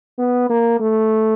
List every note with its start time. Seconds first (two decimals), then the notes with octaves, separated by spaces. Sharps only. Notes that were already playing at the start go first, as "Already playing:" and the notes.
0.18 B3
0.50 A#3
0.80 A3